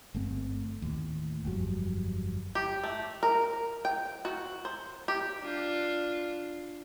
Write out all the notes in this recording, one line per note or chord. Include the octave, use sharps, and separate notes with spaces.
G1 A3 C4
D#2 A2
G1 F2 F#3 G3
G4
A3
A#4
G5
F#4
C5
G4
D4 F4